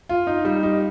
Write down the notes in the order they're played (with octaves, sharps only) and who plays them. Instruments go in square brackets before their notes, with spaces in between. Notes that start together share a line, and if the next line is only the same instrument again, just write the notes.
[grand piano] F4
D#4
G3
D#4